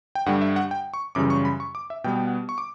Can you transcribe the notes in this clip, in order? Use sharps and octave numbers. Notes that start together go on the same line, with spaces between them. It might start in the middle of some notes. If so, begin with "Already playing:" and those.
G5
G2 D3 G3 F#5
E5
F#5
G5
C#6
F#2 C#3 E3 G3 D6
C#6
B5
C#6
D6
E5
B2 G3 B3 G5
G5
F#5
C#6
D6